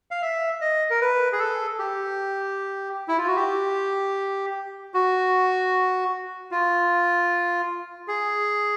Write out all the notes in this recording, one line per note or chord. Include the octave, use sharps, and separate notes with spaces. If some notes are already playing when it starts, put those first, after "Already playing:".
F5
E5
D#5
A#4
B4
G#4
A4
G4
E4
F4
F#4
G4
F#4
F4
G#4